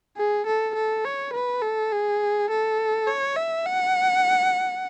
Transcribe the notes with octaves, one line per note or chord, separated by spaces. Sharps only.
G#4
A4
A4
C#5
B4
A4
G#4
A4
C#5
E5
F#5